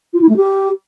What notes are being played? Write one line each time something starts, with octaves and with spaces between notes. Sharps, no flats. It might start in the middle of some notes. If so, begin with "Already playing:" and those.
F4
E4
A3
G4